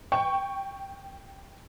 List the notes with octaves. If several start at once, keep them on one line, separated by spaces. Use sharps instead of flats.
G5 C#6